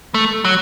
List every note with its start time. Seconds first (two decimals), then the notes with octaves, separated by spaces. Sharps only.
0.14 A3
0.45 F#3